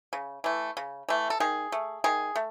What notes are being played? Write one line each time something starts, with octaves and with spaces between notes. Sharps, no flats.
C#3
E3 A3
C#3
E3 A3
A4
D#3 G#4
A3
D#3 G#4
A3